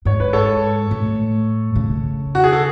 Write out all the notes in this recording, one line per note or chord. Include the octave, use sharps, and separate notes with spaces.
G#2 C#5
B4
A4 C#5
A2
C#3
F#4
G#4
A4